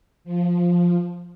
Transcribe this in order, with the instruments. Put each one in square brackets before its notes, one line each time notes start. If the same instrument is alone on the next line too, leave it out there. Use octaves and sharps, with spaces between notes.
[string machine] F3